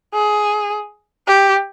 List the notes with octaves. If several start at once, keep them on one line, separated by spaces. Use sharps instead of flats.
G#4
G4